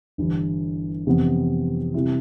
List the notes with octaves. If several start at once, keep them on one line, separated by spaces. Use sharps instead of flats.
G1 G2 E3
F2 C3 E3 B3
C3 G3 C4 E4